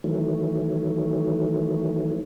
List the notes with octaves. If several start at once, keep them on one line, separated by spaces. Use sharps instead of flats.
D#3 E3 F#3 A3